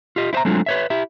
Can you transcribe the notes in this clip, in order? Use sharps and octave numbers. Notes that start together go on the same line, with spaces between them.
F4 G4 D#5
E4 C5 D#5 E5 A#5
F#3 G#3 A3 C4 D4 F4
B4 C#5 E5
E4 G4 E5